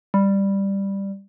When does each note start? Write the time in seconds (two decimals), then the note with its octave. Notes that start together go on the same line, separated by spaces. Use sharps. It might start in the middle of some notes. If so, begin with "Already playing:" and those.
0.14 G3